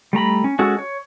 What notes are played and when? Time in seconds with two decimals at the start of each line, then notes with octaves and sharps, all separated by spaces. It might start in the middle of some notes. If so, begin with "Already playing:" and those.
0.13 G3 A3 A#5 B5
0.44 C#4
0.59 G#3 C#4 F#4 A4
0.78 C#5